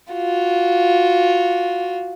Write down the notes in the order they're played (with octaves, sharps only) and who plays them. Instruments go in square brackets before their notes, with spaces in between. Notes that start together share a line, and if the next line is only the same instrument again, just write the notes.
[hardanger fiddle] F4 F#4